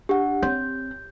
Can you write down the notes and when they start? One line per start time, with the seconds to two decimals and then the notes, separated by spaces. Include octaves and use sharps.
0.09 D4 G4 F#5
0.43 C4 C#5 C6 G6